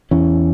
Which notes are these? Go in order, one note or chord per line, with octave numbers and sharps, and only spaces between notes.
E2 E3 C#4